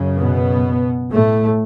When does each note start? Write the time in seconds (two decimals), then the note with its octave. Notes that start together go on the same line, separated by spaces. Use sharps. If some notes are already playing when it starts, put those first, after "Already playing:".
Already playing: F#2 C#3
0.18 B2 B3
1.12 A2 A3